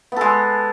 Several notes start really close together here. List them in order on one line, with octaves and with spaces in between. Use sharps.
B3 A4 G#3